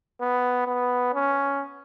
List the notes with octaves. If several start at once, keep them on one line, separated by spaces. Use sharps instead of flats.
B3
B3
C#4